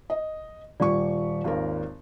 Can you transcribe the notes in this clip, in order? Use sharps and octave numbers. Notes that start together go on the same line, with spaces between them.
D#5
D#1 G3 F4 D5 C#6
G#1 D#2 A#4